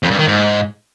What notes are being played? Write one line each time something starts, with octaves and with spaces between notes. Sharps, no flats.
F2
G2
D#3
G#2